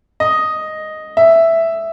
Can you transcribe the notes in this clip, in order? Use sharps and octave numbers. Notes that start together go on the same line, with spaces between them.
D#5
E5